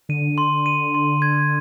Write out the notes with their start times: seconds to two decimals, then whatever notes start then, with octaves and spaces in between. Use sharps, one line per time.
0.09 D3 D#7
0.38 C6
0.66 D#7
0.94 C6
1.22 G#6